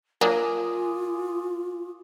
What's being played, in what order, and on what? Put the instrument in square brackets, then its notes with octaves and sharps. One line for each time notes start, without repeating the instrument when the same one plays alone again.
[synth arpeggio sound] F#3 A#3 D4 [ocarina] F4 [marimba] A#4 [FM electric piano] G#5 D6 D#6